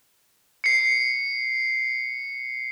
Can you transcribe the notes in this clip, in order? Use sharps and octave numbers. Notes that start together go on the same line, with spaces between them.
C7 C#7